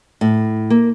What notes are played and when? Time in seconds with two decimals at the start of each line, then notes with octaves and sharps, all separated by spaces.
0.21 A2
0.70 A#3